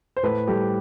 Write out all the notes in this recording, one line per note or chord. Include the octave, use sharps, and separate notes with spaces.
C5
A2 A4 B4
G3 G4 A4